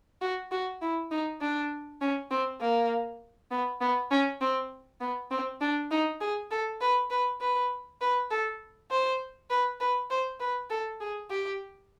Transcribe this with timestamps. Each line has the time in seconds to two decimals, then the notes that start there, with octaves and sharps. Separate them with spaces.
0.22 F#4
0.51 F#4
0.82 E4
1.11 D#4
1.41 D4
2.01 C#4
2.31 C4
2.61 A#3
3.51 B3
3.81 B3
4.11 C#4
4.41 C4
5.01 B3
5.31 C4
5.61 D4
5.91 D#4
6.21 G#4
6.51 A4
6.81 B4
7.11 B4
7.41 B4
8.01 B4
8.31 A4
8.91 C5
9.50 B4
9.80 B4
10.10 C5
10.40 B4
10.70 A4
11.00 G#4
11.30 G4